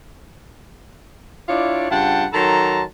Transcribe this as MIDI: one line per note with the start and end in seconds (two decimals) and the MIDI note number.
1.49 1.90 62
1.49 1.90 64
1.49 1.90 65
1.49 1.90 73
1.49 1.90 74
1.90 2.25 43
1.90 2.25 49
1.90 2.25 65
1.90 2.25 78
1.90 2.25 79
1.90 2.25 81
2.33 2.82 51
2.33 2.82 54
2.33 2.82 69
2.33 2.82 81
2.33 2.82 82
2.33 2.82 84